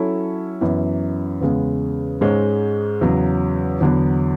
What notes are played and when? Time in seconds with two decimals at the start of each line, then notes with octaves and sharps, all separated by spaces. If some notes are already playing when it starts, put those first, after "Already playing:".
Already playing: F#3 C#4 E4 A4
0.61 F#2 E3 B3
1.41 E2 C#3 G#3 B3
2.21 G#2 G#3 C#4
3.01 E2 C#3 F#3
3.81 E2 D3 F#3 B3